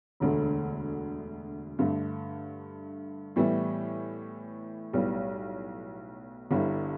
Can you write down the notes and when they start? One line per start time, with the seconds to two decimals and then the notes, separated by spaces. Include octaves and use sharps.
0.20 E1 D2 D3 A3
1.79 G2 D3 A3
3.36 A2 E3 G3 B3 E4
4.93 B1 A2 G3 B3
6.51 G1 G2 D3 G3 E4